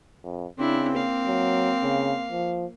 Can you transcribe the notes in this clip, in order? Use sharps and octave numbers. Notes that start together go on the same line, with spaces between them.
F2
C#3 C4 D4 E4
A#3 F5
F#3
C#3
F3